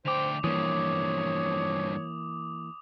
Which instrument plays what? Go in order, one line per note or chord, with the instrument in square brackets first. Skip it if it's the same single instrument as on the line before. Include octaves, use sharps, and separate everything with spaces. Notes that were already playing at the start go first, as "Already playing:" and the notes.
[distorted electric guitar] D2 G5 [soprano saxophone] C5 [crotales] D6 F7
[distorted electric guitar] G2 F3 [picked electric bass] E3 A#3 [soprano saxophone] C#5 [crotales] D#6